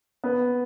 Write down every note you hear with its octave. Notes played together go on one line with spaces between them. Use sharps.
B3